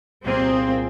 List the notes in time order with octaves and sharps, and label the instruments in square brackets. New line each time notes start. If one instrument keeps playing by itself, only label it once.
[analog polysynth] C2 A#2 A#3 G#4 [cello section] C4